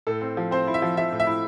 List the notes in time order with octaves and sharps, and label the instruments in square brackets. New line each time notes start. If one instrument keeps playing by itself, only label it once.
[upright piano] A2 A4
C4
F3
C4 C5
E4
E5
F3
F3 E5
A2
E5
E4